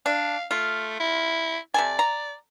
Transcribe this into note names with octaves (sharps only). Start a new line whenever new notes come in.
D4 F5
A3 F4
E4
C3 A4 D5 G#5
A#5